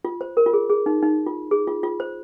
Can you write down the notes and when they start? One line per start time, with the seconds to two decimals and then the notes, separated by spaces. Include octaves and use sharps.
0.05 F4
0.21 C5
0.37 A#4
0.46 F4
0.53 G#4
0.70 G#4
0.86 D#4
1.03 D#4
1.26 F4
1.51 G#4
1.67 F4
1.83 F4
2.00 C5